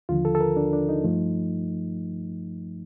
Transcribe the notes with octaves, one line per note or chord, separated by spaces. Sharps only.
D#2 D3 F3 F4
A4
A4
A#4
D4
D4
D#4
G2 F3 A3